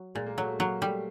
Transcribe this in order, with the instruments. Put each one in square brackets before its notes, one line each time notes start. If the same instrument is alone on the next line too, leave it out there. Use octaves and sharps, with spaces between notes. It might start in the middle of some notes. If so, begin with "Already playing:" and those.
Already playing: [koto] F#3
[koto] A#2 [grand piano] G#3
[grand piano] A#3
[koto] F#3 [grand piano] A3
[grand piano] A3
[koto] F#3 [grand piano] A#3
[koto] G3 [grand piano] A3